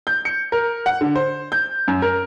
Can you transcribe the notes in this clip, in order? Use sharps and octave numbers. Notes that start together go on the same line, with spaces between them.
G6
C#7
A#4
F#5
D3
C5
G6
F#2
A#4